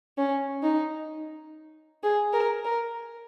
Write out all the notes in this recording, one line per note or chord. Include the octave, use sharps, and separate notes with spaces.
C#4
D#4
G#4
A#4
A#4